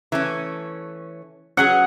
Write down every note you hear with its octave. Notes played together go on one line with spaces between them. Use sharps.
E3 A3 C#4
F#3 C#4 G#4 F#5